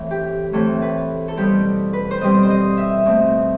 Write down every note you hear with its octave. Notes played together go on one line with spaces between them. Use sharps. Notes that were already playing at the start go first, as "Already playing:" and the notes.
Already playing: A2 E3 A3 C4
G4
A2 E3 A3 C4 A4
B4
A4
B2 G3 C4 G4
B4
C5
B2 G3 C4 D#5
C5
D#5
E5
B2 A3 C4